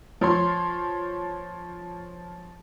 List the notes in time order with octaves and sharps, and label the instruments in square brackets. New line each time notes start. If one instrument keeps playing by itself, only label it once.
[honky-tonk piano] F3 C#5 C6